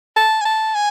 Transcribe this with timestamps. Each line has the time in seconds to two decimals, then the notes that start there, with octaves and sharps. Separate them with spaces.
0.16 A5
0.41 G#5
0.45 A5
0.74 G#5